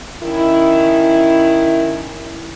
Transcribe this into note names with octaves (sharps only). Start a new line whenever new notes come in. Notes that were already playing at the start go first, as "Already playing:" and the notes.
D#3 C#4 E4